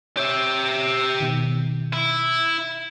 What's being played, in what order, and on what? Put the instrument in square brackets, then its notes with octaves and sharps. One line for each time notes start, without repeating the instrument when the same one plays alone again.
[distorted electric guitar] G4 E5 [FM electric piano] C#5 C7
[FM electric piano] B2 D#3
[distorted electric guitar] E4